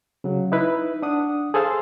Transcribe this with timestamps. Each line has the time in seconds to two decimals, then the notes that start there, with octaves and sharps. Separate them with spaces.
0.24 C#3 F#3
0.52 D#4 E4 B4
1.02 D4 F#5 D#6
1.54 G#4 A4 C5 F5 C6